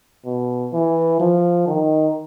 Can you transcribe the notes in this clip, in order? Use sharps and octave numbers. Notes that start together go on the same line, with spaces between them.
B2
E3
F3
D#3